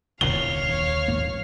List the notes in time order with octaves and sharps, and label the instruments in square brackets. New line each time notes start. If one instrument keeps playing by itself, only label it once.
[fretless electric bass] D#1 C2 A#2 [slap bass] D3 [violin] C#5 F5 [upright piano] G7
[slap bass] D#2
[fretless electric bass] A#1 G#2 A#3